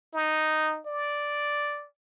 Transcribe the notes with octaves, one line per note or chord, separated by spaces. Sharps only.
D#4
D5